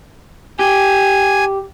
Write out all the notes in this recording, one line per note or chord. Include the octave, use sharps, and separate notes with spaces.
G4 G#5